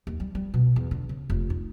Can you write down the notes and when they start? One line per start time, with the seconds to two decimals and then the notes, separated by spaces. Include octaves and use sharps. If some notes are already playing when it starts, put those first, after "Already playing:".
0.07 D#2
0.20 G3
0.35 G3
0.54 B2
0.76 E2
0.91 D3
1.09 C#3
1.30 F1
1.50 D#4